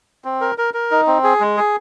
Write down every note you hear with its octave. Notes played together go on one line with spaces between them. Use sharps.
C4
A#4
A#4
A#4
D#4
C4
G#4
G#3
G#4